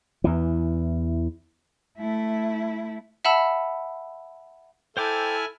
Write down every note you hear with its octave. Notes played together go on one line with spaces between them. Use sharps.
E2 E3
A3 E4
E5 F#5 A5 B5 E6
E4 A4 C5 G5 G#5 D6 F6